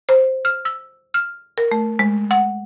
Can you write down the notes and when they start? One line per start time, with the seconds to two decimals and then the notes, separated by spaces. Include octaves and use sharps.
0.09 C5
0.45 F6
0.65 E6
1.14 F6
1.58 A#4
1.71 A3
1.99 G#3
2.31 F#5